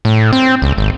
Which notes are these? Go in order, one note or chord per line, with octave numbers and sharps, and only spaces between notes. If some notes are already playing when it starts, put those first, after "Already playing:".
A2
C4
C#2
G#1